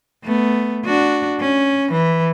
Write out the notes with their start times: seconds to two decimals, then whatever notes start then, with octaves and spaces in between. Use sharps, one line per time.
0.24 A3 B3
0.85 D4 F#4
1.39 C#4
1.92 E3